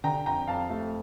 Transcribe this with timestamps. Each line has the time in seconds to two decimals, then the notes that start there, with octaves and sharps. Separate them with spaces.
0.04 D3 G5 A#5
0.26 F2 G5 A#5
0.47 F2 F5 A5
0.70 A3